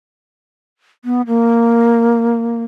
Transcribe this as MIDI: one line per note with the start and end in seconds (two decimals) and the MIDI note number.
1.05 1.21 59
1.27 2.64 58